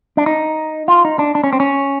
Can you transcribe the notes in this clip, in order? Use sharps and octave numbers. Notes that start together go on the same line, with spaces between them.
D4
D#4
F4
D#4
D4
D4
C#4
C4
C#4